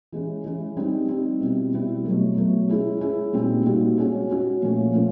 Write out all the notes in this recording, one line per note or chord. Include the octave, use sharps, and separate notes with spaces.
E3 G#3 C#4
E3 G#3 C#4
G3 C4 D#4
G3 C4 D#4
B2 G3 C4 E4
B2 G3 C4 E4
B2 F#3 A3
B2 F#3 A3
G#3 C#4 E4 G#4
G#3 C#4 E4 G#4
A#2 G3 C4 D#4 F#4
A#2 G3 C4 D#4 F#4
G#3 C#4 F#4
G#3 C#4 F#4
A#2 F3 A3 C#4
A#2 F3 A3 C#4